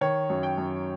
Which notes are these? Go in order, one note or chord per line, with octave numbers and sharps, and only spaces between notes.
D#3 C#5
F#2
G5
F#2